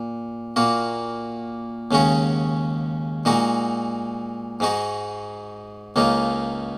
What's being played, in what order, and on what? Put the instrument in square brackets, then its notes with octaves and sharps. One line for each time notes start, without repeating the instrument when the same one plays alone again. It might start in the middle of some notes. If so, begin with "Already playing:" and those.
Already playing: [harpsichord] A#2
A#2 A#3 F#4
D#2 C#3 G#3 C#4 F#4
A#2 G#3 D#4 F#4
G#2 G#3 D#4 F#4
C#2 C#3 A#3 D#4